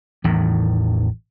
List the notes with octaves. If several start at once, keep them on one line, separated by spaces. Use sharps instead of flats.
A1 E2 A2 D#3